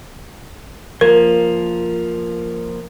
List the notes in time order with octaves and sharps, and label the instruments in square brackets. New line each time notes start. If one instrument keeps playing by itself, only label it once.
[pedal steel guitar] F3 A#3 [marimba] A#4